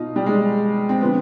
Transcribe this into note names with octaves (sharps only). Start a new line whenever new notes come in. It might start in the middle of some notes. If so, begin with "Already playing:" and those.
Already playing: B2 D#4 F4
G3
G#3
C4
D3 F3 B3